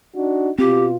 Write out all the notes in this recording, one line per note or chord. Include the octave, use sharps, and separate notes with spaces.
D4 D#4 F#4
B2 C4 F4 G4